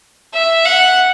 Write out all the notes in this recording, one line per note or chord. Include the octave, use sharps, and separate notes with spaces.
E5
F#5